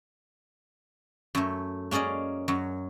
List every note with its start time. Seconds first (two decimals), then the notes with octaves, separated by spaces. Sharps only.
1.35 F#2 A3
1.91 A#3 C#4 G#4 D5 D#5
2.48 F#2 F#3